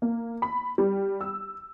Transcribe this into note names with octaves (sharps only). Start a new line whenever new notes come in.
A#3
B5
G3
E6